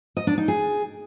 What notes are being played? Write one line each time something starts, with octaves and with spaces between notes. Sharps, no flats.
D#5
D4
D#4
G#4